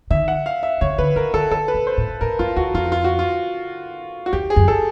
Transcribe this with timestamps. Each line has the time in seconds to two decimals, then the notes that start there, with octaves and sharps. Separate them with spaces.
0.10 D#3 E5
0.28 F#5
0.46 F5
0.63 E5
0.81 C#3 C#5
0.98 D3 B4
1.16 D#3 A#4
1.34 D#3 A4
1.51 D#3 A4
1.68 B4
1.74 A#2
1.87 C5
1.98 A2
2.21 A2 A#4
2.39 F2 F4
2.56 E2 F#4
2.74 F2 F4
2.92 F4
3.04 F#4
3.19 F4
4.26 F#4
4.33 F2 G4
4.50 G#4
4.56 F#2
4.68 A4